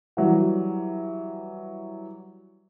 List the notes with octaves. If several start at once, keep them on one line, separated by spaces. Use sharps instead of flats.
E3 F#3 G3